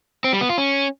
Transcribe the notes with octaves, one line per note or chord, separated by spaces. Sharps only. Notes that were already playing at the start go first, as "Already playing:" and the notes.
C4
G3
B3
F4
C#4